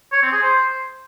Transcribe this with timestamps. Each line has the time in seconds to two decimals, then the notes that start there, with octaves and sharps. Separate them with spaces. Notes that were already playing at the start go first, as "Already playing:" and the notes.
0.13 C#5
0.22 C4
0.32 G#4
0.42 C5